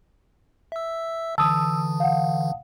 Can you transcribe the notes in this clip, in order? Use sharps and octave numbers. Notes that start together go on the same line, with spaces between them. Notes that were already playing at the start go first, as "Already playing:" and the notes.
E5 E6
D3 E3 A5 D#6 E6
F5 F#5